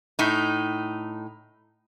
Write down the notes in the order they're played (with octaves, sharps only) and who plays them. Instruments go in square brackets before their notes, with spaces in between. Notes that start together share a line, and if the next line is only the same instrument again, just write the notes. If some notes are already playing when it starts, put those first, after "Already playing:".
[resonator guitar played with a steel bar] A2 D#4